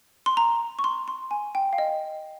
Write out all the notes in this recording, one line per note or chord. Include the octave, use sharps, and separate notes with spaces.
C6
A#5
C#6
C6
C6
G#5
G5
F5
D#5